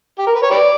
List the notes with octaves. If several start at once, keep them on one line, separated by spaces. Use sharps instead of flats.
G4
A#4
B4
C#5
G4 B4 D5